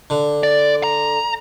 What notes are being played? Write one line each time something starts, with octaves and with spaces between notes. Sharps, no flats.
D3
D5
A#5